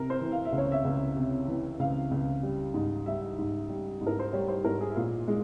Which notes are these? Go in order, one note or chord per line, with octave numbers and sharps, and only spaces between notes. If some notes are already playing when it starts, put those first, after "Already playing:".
Already playing: C3 A#4
C5
E3
F5
E5
C#2
C#5
E5
C#2
C3
E3
C#2 F5
C#2
G3
G#2
G3 E5
G#2
G3
G#2
A#4
C5
G3 C#5
C5
G#2 A#4
G#4
E4
A#2 F4
G#3